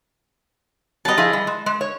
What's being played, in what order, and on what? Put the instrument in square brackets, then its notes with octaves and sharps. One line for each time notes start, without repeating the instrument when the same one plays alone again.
[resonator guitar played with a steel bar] F#3 G3 [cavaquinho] D#5 A5
[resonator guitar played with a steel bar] F3 E4 G#4
G3
G#3
G#3
C#5